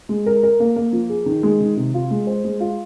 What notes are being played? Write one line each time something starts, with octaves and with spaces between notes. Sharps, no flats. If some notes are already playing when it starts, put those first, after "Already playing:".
G#3
A#4
A#4
A#3
A#3
F3
G#4
D#3
G#3
D#3
C3
F4
G#3
C5
G#3
F4